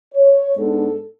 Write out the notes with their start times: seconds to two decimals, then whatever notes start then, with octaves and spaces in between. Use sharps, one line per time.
0.14 C#5
0.57 G#2 G#3 B3 D4 A4